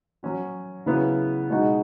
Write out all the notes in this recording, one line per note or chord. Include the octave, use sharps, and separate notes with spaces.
F#3 C#4 F#4
C#3 F#3 B3 E4
B2 G#3 D#4 F#4